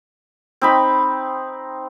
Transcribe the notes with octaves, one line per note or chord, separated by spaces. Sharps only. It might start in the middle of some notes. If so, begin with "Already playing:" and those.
C4 D#4 B5